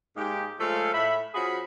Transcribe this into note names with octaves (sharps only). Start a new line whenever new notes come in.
G#2 G#3 A#3 D#4 G4
F3 G#3 A3 A4 C#5 F5
A2 E5 B5
F3 C#4 F#4 G#4 B5